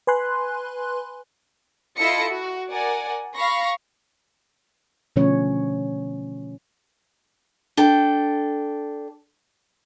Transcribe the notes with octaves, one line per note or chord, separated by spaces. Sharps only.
B4 G#5 B5 C6 F#6
E4 F4 A4 D#5 A#6 C#7
F#4
A#4 D5 F#5 G#5
F5 B5 C#6 A#6
B2 D3 F3 A3 C#4 C#5
D4 A4 G5